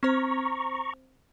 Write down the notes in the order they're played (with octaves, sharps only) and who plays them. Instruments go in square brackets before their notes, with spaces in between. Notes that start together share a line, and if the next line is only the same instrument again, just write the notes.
[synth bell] C4 C5 [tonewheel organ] A#5 C#6